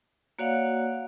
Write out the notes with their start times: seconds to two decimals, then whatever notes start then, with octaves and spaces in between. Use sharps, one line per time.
0.39 A#3 F#4 C#5 D5 F5 F#5